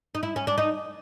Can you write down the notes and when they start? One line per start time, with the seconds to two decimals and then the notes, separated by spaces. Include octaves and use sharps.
0.15 D#4
0.23 E4
0.36 C#4
0.47 D4
0.58 D#4